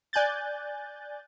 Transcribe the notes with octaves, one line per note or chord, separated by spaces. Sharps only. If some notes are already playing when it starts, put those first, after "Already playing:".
D5 G#5 F#6 G6 A6